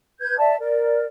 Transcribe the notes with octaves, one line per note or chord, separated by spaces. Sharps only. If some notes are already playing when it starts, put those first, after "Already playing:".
B4 G6 G#6
D5 E5 A5
A#4 D5